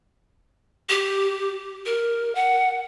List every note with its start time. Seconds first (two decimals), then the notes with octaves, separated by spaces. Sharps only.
0.89 G4
1.86 A#4
2.35 F#5